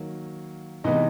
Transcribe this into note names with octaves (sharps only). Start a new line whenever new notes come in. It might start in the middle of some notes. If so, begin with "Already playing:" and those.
Already playing: D#3 F#3 A#3
C3 E3 G#3 B3 D#4 D#5